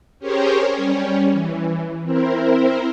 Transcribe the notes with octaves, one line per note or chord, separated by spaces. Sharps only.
C#4 G4 G#4 A#4 C5 C#5
G3 C#4
E3
C4 E4 A#4 C5